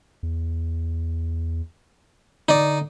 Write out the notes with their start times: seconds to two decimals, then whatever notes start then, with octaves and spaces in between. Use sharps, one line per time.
0.23 E2
2.49 D3 D#4 D5